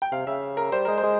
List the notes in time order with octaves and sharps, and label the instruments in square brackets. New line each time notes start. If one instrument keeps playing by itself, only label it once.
[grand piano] G5
[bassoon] C3 [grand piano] F5
[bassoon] C#3 [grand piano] E5
[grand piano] A#4
[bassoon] G3 [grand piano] C5
[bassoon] G#3 [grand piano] A#4
[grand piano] C5
[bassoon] G#3